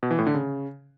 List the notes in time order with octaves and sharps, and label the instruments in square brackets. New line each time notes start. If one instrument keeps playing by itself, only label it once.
[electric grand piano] B2
E3
A2
D3
C#3